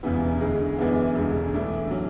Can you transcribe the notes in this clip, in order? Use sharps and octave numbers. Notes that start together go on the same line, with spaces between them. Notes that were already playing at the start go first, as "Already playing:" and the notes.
E1 E2 C#3 E3 B3
D2 D3 G#3
F#2 E3 G#3 B3 D4
E1 D2 C#3 G#3
A2 E3 A3 D4
D3 F#3 C#4